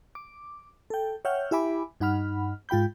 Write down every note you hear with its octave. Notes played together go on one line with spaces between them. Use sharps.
D6
A4 G5
C#5 E5 F#5 G5 F6 G6
E4 G4 E5 G#5 B5 D6
G2 D#4 F#5 B5 F6
G#2 F4 G5 B5 G6